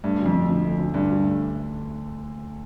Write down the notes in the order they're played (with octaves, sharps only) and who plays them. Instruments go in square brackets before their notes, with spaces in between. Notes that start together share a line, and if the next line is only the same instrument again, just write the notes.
[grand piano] G2 [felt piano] A3
[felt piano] D2
[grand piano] F2
[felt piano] D3
D2
A3
D2
[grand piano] G2 [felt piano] D3
[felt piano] D2
A3